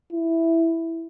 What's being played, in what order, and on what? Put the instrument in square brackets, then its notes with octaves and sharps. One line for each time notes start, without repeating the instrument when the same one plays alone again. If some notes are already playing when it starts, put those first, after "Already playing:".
[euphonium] E4